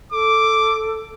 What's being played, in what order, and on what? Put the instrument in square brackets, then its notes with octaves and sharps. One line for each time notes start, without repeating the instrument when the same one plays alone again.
[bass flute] A4 [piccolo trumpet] D6